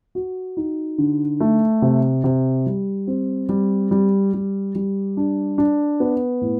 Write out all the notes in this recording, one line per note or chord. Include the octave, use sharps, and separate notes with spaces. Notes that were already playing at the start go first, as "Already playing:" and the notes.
F#4
D#4
D3
A3
C3
C3
G3
C4
G3
G3
G3
G3
D4
D4
B3
A2